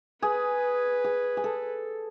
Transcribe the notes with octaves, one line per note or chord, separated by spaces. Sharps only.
G#4 B4
G#4
G#4
A4